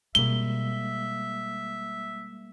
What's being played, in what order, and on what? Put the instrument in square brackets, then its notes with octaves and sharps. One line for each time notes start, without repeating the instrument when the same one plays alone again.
[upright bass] B2 C4 [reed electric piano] G3 G#3 A#3 [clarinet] E5 [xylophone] G7